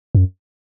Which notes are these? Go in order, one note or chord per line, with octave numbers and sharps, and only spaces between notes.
F#2